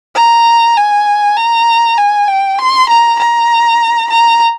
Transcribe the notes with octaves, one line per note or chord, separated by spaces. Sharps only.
A#5
G#5
A#5
G#5
G5
C6
A#5
A#5
A#5